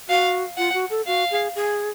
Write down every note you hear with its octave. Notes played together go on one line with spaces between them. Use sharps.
F#4 F5
F4 F#5
F#4
A4
F#4 F5
G#4
G#4